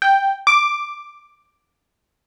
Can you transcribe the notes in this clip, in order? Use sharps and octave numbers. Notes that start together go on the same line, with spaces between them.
G5
D6